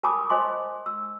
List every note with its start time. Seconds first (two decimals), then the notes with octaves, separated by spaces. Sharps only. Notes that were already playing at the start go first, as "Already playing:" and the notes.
0.03 A#4 G#5 A5 B5 D6 D#6
0.30 C5 D#5 G#5 C6 D6
0.86 E6